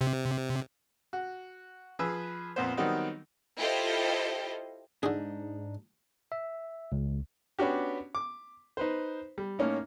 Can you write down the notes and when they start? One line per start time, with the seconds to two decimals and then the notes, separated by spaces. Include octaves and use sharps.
0.01 C3
1.13 F#4
1.99 F3 G#4 B4 E6
2.56 F2 A#2 B3 B4 C5
2.77 D#3 F#3 G3 B3 C4 D#4
3.57 E4 F4 G4 A4 C5 D#5
5.03 G#2 D3 D4 D#4 G#4
6.32 E5
6.92 C#2
7.59 B3 C#4 D4 F#4 G4
8.15 D6
8.77 D#4 B4 C5
9.38 G3
9.59 A2 A#3 C#4 D#4